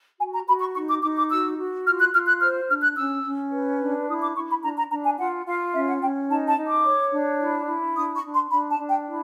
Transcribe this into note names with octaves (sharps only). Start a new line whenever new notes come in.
F#4 G#5
A#5
F#4 B5
C#6
D#4 C#6
D6
D#4 D6
D6
F#4 E6
F#4
F4 F6
F#6
F4 F6
F#6
C5 F6
D4 F6
F#6
C#4 E6
C#4
B4
D4
E4 D#6
D6
E4 C#6
B5
D4 A#5
A#5
D4 A#5
G#5
F4 F#5
F4 F5
C#4 E5
F#5
C#4 G5
D#4 A5
A5
D#4
D6
C#5
D4
E4
E4
D4 D#6
C#6
D4
C6
D4 B5
A5
D4
G5
E4